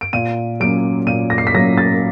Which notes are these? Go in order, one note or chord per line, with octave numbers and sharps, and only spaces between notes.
D7
A#2 D#7
F#3 A#3 C#4 D7
A#2 D#7
A#6
C7
B6
F#3 A#3 C#4 A#6
A6